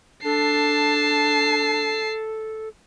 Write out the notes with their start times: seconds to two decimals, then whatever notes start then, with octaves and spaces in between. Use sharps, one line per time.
0.25 D4 A4 A5 C7